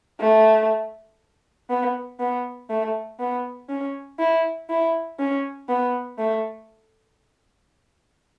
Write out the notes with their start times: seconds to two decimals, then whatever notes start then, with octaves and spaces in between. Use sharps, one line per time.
0.20 A3
1.70 B3
2.20 B3
2.70 A3
3.20 B3
3.69 C#4
4.19 E4
4.70 E4
5.19 C#4
5.69 B3
6.18 A3